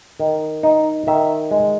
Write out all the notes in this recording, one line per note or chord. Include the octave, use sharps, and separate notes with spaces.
D#3
D#4
D#3 E5
G#3